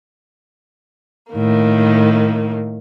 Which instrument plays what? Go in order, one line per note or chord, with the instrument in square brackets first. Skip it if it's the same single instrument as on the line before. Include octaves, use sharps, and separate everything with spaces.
[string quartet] A2 D#3 A#3